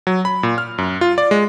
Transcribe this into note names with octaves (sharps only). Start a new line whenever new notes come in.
F#3
B5
A#2
F6
F#2
F4
D5
G#3